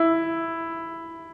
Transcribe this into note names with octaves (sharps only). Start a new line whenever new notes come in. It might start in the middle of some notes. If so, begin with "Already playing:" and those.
Already playing: E4